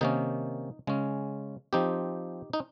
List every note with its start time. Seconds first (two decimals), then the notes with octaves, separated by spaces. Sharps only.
0.01 C3 D#3 A#3 C#4 D#4
0.87 C#3 G#3 C#4
1.73 F3 C4 D#4 G4
2.53 D#4